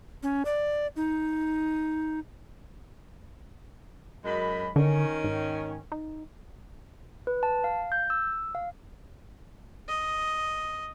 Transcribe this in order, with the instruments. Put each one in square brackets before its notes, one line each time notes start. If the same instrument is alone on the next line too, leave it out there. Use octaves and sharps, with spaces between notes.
[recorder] C#4
D5
D#4
[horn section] F#2 G#3 B5
[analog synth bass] D3 [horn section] D#3 C#4
[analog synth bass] G#2
D#4
[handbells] B4
A5
F5
G6
E6
F5
[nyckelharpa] D#5